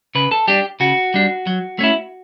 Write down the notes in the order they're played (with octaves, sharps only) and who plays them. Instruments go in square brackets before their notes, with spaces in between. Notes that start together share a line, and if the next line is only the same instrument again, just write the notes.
[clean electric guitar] C#3 B4
A4
G3 D4 G4
C#3 F#4
G3 D4
F#3
A3 C#4 E4